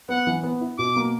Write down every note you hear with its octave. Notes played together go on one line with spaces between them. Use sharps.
B3 F#5
E3
B3
E4
B2 D6
A#3